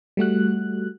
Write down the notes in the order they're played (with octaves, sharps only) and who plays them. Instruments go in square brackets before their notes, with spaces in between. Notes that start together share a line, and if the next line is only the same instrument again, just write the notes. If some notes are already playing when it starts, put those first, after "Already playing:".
[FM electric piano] G3 A3 F#4 F#6